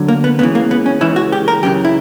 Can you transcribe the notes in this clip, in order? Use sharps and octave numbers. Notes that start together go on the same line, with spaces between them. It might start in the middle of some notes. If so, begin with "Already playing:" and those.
Already playing: D2 D3 F#3
A#3
B3
C#2 C#3 E3 B3
A#3
B3
C#4
C#2 C#3 E3 E4
F#4
G4
A#4
F#2 C#3 E3 G4
E4